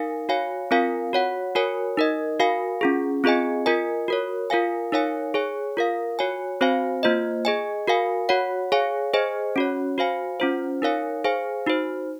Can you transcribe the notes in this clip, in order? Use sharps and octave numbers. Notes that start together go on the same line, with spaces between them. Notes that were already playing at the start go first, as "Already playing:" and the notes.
Already playing: D#4 A#4 F5 G#5
F#4 C#5 F5 G#5
C4 F4 A#4 F5 G#5
F#4 C#5 F#5
F#4 A#4 C#5 G#5
D#4 A#4 D#5
F#4 A#4 F5 G#5
C#4 F4 G#4
C4 F4 G#4 D#5 G#5
F4 A#4 D#5 G#5
F#4 A#4 C#5
F4 A#4 F5 G#5
D#4 A#4 C#5 F5 G#5
G#4 C#5 G#5
F4 A#4 F5
F#4 C#5 G#5
C4 F#4 C5 F5 G#5
A#3 F4 C5 D#5
G#4 D#5 G#5
F#4 A#4 F5 G#5
F#4 C#5 F#5
G#4 C#5 F5 G#5
G#4 C5 D#5 G#5
C#4 F#4 C#5
F#4 C5 F5 G#5
C#4 F4 C5
D#4 A#4 C#5 F5 G#5
G#4 C5 F5 G#5
D#4 F#4 C5